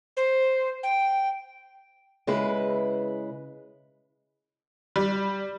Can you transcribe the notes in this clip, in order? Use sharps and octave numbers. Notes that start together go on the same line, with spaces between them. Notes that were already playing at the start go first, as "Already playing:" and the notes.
C5
G5
C#3 G#3 E4 B4
G3